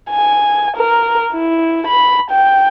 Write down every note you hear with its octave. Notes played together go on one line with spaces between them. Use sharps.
G#5
A#4
E4
B5
G5